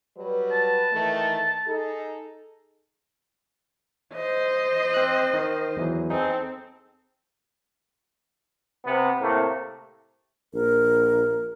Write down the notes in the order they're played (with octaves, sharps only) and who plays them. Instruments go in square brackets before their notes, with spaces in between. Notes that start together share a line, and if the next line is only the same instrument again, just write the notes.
[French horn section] F#3 G3 B4
[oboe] A5
[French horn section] D#3 E3 A3
D#4 G#4 A4
[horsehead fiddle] C5 D#5
[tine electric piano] C4 F#6
D#3
E2 E3 F#3
[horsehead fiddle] C4 A4 [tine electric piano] D#4 G#4
[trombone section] C3 B3
A2 C3 A3 A#3
[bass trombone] A#1 [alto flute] A#4